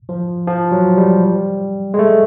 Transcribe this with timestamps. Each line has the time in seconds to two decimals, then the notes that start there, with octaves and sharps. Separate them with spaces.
0.09 F3
0.47 F3
0.72 F#3
0.97 G3
1.94 G#3
1.99 A3